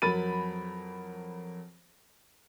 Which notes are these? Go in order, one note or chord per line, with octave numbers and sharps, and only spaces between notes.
F2 F#3 A#4 B5 A6 D#7